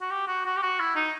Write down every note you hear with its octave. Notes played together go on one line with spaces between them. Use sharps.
F#4
G4
F#4
F#4
G4
F#4
E4
D#4